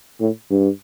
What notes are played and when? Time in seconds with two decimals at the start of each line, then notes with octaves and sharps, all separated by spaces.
0.20 A2
0.51 G2